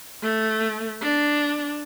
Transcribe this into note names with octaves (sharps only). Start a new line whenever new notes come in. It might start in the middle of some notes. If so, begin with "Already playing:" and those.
A3
D4